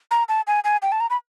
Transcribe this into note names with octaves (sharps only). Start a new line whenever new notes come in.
A#5
A5
G#5
G#5
G5
A5
A#5
B5